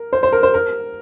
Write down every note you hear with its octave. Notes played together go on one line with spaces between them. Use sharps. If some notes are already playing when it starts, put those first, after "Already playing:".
Already playing: A#4
C5
C5
A#4
C5
A#4